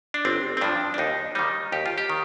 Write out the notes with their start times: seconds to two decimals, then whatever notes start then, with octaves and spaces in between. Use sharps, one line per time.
0.14 D4
0.25 G1 C4
0.57 C4
0.61 G2 F3 D4
0.94 D4
0.98 D#2 D#4
1.35 D#3 G3 D#4
1.72 D#2 G4
1.86 F4
1.98 G4
2.10 D#3